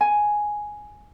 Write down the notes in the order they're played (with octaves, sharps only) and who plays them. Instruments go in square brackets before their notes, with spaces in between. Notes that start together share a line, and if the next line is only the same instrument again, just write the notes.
[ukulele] G#5